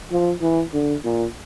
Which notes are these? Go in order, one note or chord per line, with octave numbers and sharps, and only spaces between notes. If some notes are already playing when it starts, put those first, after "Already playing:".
F3
E3
D3
A#2